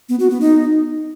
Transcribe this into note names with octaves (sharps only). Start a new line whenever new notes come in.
B3
F#4
B3
D#4